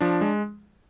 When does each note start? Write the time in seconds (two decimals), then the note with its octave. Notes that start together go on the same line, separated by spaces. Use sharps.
0.01 F3 D4
0.21 G#3